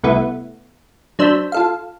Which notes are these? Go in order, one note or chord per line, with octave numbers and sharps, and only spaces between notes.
C2 A3 B3 E4
F#3 D4 C5 E6 G6 B6
F4 A4 F5